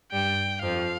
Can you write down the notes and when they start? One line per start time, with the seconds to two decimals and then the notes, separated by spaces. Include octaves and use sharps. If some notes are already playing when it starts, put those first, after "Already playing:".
0.12 G2 G3 G5
0.63 F2 F3 F5